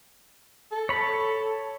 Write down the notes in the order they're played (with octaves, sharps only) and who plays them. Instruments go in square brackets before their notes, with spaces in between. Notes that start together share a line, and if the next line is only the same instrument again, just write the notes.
[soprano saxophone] A4
[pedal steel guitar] C#5 B5